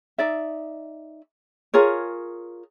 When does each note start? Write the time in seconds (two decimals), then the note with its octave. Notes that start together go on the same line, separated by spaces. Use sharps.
0.18 D#4 D5 E5
1.74 F4 G#4 A#4 C#5